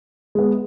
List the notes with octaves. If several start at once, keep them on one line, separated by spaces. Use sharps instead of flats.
G#3 B3